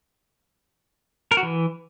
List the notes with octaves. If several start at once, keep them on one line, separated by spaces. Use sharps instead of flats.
A#4
F#4
E3